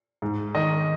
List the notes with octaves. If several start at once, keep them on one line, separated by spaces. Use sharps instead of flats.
G#2
D#3 D#5